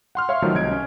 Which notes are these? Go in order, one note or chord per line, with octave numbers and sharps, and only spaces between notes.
F#5 C6 F6
C#5 E5 F5 C6
D#3 F3 F#3 A3
C2 D#5 G#6 D7
C#4